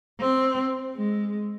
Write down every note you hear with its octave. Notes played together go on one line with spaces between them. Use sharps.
C4
G#3